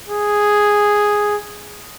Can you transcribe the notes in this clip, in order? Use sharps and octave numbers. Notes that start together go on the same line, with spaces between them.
G#4